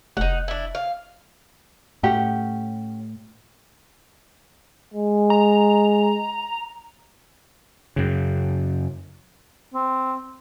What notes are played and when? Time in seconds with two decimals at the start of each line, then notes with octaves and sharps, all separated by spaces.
0.17 F1 D#4 F#5
0.48 D4 E4
0.75 F5
2.03 A2 C#4 G4 F#5
4.94 G#3
5.30 A#5
7.96 F#2 C#3
9.74 C4